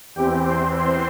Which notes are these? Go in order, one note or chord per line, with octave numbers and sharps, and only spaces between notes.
E2 E3 C4 G4 G5
C5 C6
C5 C6